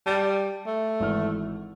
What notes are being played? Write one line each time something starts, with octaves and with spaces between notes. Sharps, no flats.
G3 A5 A6 G7
A3
G#1 E3 F6